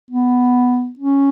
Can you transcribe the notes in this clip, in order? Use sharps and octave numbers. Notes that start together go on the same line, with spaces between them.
B3
C#4